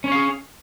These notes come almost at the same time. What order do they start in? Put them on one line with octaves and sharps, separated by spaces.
C#4 C#5 F5 G#4